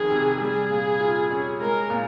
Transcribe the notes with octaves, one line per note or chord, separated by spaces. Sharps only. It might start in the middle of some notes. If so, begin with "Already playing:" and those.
Already playing: F1 F2 D#3 G#4
C3
G3 G#4
A#2
F4
C#4
G#3 A#4
A#2